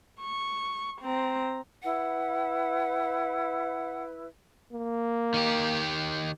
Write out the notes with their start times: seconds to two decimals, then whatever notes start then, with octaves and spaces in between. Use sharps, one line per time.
0.21 C#6
1.01 C4 A#5
1.83 E4 B4 F#5
4.73 A#3
5.34 D#3 G4